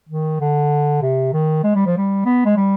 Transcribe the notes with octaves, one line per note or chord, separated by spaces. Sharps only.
D#3
D3
C3
D#3
G#3
G3
F3
G3
B3
G#3
G3